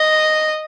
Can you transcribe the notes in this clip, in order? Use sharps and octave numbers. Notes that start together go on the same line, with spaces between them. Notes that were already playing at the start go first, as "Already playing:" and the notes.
Already playing: D#5